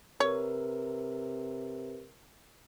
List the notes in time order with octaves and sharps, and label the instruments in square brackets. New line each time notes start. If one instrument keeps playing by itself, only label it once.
[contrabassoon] C3 [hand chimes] A#4 B4 [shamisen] C#5